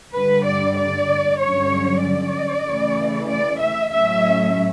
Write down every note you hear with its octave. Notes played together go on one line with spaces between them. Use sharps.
G2 D3 G3 B4
D5
D5
G2 D3 F#3 C#4 C#5
D5
C#3 E3 A3
D5
E5
A2 F#3 A3 C#4 E5